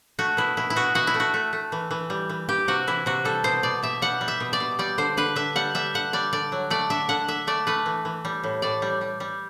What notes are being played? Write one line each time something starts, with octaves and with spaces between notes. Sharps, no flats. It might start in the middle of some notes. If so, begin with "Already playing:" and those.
A3 F#4
B2 E4
B2 E4
E4
B2 F#4
B2 F#4
E4
A3
F#4
A3
A3
E3
E3
G3
E3
E3 G4
C3 F#4
E3 E4
C3 F#4
G3 A4
B2 C5
B2 D5
B2 E5
G3 F#5
G3
E5
B2
D5
B2
G3 D5
D3 C5
D3 B4
D3 E5
G3 F#5
G3 E5
D3 F#5
G3 D5
D3 D5
F#3
A3 D5
D3 E5
D3 F#5
D3 E5
A3 D5
A3 B4
E3
E3
G3
A2
A2 D5
G3
G3
G3